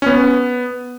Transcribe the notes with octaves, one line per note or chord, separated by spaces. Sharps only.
C#4
B3